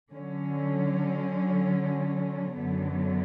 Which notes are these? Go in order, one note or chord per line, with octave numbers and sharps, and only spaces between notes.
D3 F#3 C#4
F#2 D3 F#3 B3